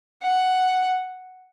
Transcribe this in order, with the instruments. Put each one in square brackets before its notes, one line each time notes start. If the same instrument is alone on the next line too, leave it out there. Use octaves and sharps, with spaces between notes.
[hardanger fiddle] F#5